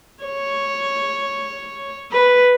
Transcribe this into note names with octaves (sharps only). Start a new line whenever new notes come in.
C#5
B4